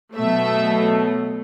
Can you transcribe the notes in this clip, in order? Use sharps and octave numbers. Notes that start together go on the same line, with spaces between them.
B2 F#3 A3 E5